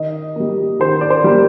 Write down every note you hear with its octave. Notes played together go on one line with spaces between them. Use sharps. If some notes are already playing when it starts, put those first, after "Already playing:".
Already playing: D#3 D#5
G3 A#3
D#3 C5
D5
C5
G3 A#3